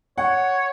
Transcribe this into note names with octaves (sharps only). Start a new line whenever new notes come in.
C#5 F#5